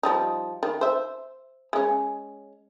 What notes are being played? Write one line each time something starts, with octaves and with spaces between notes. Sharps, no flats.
F3 G3 D#4
D#3
C5 E5
G#3 C#4